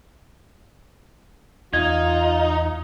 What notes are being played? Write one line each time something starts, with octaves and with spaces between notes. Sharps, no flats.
E2 D#4 F4 G#6